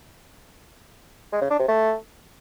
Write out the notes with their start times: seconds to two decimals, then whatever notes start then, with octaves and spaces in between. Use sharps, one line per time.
1.32 G#3
1.41 C#3
1.50 D4
1.59 C3
1.68 A3